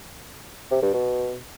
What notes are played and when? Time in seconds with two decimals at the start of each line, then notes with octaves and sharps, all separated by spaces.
0.71 C3
0.82 G2
0.93 B2